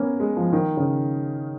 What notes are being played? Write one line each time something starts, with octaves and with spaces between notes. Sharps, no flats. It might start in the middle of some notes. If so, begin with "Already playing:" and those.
Already playing: A#3 B3 C#4
G#3
F3
D#3
C#3